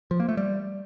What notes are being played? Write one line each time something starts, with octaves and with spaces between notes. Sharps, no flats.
F3
A#3
A3
G3